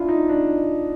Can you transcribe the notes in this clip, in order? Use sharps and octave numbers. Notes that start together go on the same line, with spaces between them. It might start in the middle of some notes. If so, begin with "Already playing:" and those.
Already playing: D4 E4 F4
D#4
D4